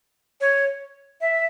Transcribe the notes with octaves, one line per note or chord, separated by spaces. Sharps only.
C#5
E5